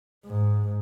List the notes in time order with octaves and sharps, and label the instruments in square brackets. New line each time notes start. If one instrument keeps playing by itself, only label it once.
[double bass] G#2